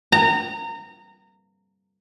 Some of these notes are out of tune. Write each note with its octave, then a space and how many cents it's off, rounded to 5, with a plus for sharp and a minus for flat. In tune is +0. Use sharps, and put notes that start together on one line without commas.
A#5 -25